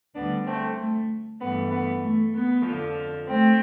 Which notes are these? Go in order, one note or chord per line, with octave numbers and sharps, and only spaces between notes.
D2 D3 G3 B3 D4
A3 C4
A3
G2 E3 A3 B3
B3
A3
B3
F2 D3 F3
A3 C4